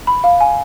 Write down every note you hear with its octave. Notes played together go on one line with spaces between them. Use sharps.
B5
F5
G#5